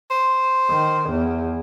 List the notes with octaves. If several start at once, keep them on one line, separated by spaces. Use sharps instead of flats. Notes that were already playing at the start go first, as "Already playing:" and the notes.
C5
D#3
E2